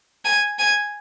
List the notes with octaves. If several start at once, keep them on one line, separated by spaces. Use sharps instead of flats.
G#5
G#5